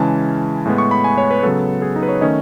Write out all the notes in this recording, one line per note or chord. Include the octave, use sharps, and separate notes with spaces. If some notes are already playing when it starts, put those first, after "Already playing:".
Already playing: C#3 E3 G#3 C#4 A5
A2 G#3 B3
C#6
B5
G#5
C#5
B4
C#3 F#3 B3 A4
G#4
D#4
B4
C#5
D#3 A3 C#4 D#5